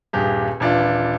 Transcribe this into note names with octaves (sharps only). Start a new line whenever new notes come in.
D#1 G2 G4 G#4
D#1 E3 D4 F4